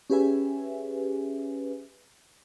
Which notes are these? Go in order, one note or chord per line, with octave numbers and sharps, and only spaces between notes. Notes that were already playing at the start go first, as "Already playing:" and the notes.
C#4 G4 G#4 B4 E5 G#5